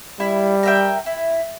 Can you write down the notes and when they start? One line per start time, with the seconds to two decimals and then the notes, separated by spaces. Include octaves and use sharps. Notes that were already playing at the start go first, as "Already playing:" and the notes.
0.20 G3 E4
0.63 A#4 E5 G5
1.06 E4